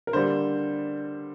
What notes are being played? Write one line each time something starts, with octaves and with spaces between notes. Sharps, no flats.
A#4
D3 G3 A#3 C5